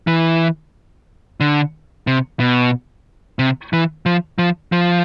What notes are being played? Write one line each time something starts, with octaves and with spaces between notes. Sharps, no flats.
E3
D3
C3
B2
C3
E3
F3
F3
F3